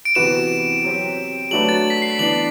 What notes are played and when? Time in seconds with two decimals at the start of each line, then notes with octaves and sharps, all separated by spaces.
0.05 D7
0.15 C3 E3 B3 F#4 B4 E7
0.84 F#3 C4 G4
1.51 F#3 A3 D4 F#4 B4 F#7
1.69 A6
1.90 B6
2.02 C7
2.19 E3 B3 D4 F#7